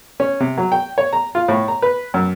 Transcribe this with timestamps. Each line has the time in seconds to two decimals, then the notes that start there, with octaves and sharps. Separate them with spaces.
0.20 C#4
0.40 C3
0.57 F#3
0.72 G5
0.98 C#5
1.13 A#5
1.35 F4
1.48 A2
1.68 A#5
1.82 B4
2.14 F#2